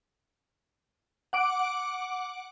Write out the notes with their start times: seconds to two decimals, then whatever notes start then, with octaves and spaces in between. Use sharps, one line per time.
1.33 F#5 D6 D7